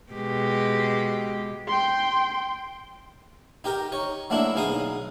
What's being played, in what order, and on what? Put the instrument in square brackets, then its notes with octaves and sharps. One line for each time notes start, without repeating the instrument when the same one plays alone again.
[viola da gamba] B2 G#3 G4
[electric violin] G5 C6
[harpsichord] D#4 G4 A#4 G5
D#4 C#5
F#3 A3 A#3 D4 E4
B1 D#4 G#4 F5 D#6